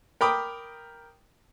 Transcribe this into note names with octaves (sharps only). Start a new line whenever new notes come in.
A#4 G5 B5 D6 D#6